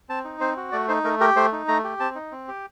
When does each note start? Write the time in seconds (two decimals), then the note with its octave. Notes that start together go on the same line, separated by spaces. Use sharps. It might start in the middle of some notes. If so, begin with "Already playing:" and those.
0.09 C4 A5
0.25 D#4
0.40 C4 C5
0.57 F#4
0.72 A3 D5
0.88 D#4 C5
1.04 A3 A#4
1.21 G4 A#4
1.36 A3 C5
1.52 D#4
1.68 A3 A#5
1.84 G4
2.00 C4 A5
2.15 D#4
2.32 C4
2.48 G4